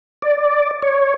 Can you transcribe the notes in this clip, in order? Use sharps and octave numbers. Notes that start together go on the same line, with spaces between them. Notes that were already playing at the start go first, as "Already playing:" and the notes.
D5
C#5